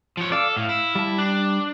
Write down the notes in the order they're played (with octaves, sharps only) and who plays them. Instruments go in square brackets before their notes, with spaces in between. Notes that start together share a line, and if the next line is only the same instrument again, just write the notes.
[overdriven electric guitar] F3 C#5
[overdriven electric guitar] A4 [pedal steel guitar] D5 F5
[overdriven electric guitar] A2 [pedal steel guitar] F5
[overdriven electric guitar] E4
[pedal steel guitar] G3 A5
[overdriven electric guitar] D4